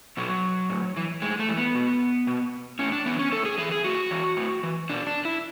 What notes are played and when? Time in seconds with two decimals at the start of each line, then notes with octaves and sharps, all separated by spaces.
0.17 B2 F#3
0.70 A2
0.97 E3
1.22 A2 G#3
1.39 A3
1.49 E3
1.57 B3
1.75 B2
2.27 B2
2.79 A2 C#4
2.92 D4
3.06 E3 B3
3.19 C#4
3.32 A2 A4
3.46 G#4
3.58 E3 G#4
3.72 G#4
3.84 A2 F#4
4.11 E3
4.37 A2
4.63 E3
4.90 B2 D4
5.07 D4
5.25 E4